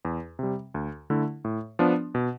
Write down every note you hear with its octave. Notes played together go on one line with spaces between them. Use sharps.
E2
C3 G3
D2
D3 A3 E4
A2
F3 B3 D4
B2